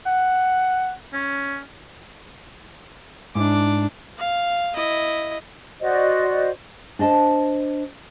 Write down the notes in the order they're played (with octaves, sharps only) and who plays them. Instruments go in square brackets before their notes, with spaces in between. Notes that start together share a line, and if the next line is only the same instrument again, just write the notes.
[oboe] F#5
C#4
[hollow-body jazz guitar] G#2 E4 [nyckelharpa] D4 D6
[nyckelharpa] F5
E4 D#5
[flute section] F#4 C5 D5 D#5
[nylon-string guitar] D4 C5 D#5 A5